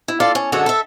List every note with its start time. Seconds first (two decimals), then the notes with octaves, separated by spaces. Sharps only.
0.08 E4
0.20 F4 A4 D5 F5
0.35 C#4
0.52 F#2 D3 G#3 F#4 A4 C#5
0.66 A4 E5